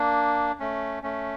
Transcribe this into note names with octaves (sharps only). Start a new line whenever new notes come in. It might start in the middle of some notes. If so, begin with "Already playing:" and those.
Already playing: A#3 D4
A3 C#4
A3 C#4